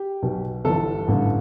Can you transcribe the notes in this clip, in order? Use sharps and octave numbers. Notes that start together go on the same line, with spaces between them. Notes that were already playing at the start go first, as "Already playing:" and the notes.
Already playing: G4
B1 B2
G1 G2 E3 A4
A1 G2 D3